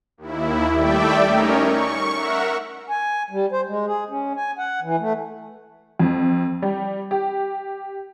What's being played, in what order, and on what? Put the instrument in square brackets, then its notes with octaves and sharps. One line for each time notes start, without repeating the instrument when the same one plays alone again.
[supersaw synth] D#2 E4
G3 A3 D5 E5 G5
C#4 D#4 A#4 C#5
C#6
A#4 E5 F#5
[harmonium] G#5
G3
C5
G#3
G#4
C#4
G#5
F#5
E3
A3
[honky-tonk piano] F2
G3
G4